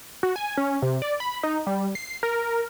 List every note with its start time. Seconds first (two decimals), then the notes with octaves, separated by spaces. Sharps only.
0.23 F#4
0.36 G#5
0.57 C#4
0.82 C3
1.02 D5
1.20 B5
1.43 D#4
1.67 G3
1.95 C7
2.23 A#4